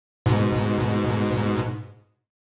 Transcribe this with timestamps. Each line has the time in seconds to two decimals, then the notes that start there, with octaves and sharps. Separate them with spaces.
0.26 G#2 B2